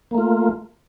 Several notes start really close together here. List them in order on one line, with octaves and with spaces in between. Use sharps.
A#3 A3 F4